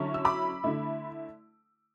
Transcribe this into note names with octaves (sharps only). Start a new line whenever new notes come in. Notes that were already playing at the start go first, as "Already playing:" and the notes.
Already playing: D3 F#3 C#4 E4 A5 C#6
E6
B5 D6
D3 A3 E4